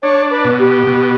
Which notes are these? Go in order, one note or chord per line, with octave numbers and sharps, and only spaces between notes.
D4 C#5
B4
B2
G4
B2